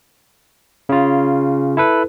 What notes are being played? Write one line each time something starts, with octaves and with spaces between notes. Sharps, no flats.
C#3 F4
E4 A4 B4